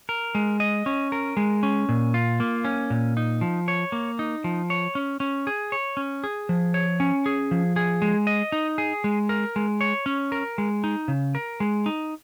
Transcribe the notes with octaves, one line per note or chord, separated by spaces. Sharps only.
A#4
G#3
D#5
C#4
A#4
G#3
C#4
A#2
F4
A#3
C#4
A#2
D#4
F3
C#5
A#3
D#4
F3
C#5
C#4
C#4
G#4
C#5
C#4
G#4
F3
C#5
C#4
G#4
F3
G#4
G#3
D#5
D#4
G#4
G#3
A#4
G#3
C#5
C#4
A#4
G#3
D#4
C#3
A#4
G#3
D#4